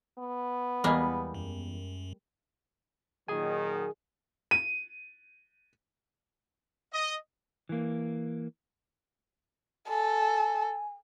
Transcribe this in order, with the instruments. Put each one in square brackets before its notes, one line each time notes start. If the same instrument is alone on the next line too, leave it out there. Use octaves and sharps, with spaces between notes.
[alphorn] B3
[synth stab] E2 [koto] G3 G#3 A#3
[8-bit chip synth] F#2
[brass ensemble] A#2 D#3 F#3 [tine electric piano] G#4 G#5
[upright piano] D#7
[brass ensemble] D#5
[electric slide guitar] E3 A#3
[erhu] A4 [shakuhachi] G#5